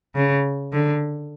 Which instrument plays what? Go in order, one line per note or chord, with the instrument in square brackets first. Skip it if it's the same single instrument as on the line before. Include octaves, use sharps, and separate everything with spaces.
[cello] C#3
D3